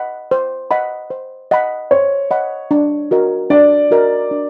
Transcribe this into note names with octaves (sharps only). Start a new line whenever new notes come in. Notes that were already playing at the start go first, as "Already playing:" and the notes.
Already playing: D#5 F#5 B5
C5
D#5 F#5 B5
C5
D#5 F#5 B5
C5 C#5
D#5 F#5 B5
D4
F#4 A#4 D#5
D4 D5
F#4 A#4 D#5
D4